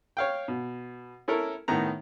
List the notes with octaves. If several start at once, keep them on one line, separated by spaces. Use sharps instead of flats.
C#5 F5 G5
B2
C#4 E4 A4 A#4 C#5
A2 D#3 B3 A#5